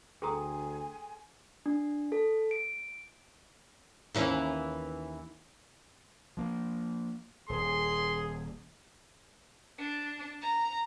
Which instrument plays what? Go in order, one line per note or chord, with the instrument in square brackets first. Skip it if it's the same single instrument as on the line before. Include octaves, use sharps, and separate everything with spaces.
[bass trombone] D2 [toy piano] G#4 A4 A#5 [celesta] G5 C6 D#6 [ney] G#5
[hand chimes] D4
A4
D7
[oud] D#2 E3 C#4
[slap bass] F3 A#3
[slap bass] D#1 [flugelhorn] G#4 [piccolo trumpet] C6
[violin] D4
A#5